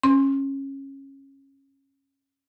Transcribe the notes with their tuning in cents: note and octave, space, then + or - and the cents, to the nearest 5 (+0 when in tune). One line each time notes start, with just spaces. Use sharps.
C#4 -20 C6 +15